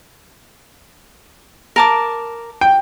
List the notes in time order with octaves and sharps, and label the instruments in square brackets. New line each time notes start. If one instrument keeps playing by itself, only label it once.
[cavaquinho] A#4 A5 D6
[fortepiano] G5